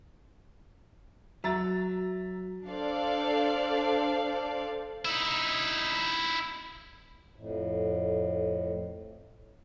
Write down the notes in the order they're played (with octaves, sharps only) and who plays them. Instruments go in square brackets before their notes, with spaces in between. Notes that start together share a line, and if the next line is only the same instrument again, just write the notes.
[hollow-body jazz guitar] F#3 [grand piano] E5 A#5 A6
[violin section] D4 A4 C5 D5 F5
[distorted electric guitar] D#4 E4
[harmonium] F2 A2